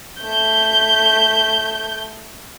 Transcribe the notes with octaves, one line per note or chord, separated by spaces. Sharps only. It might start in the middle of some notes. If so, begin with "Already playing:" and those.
A3 G6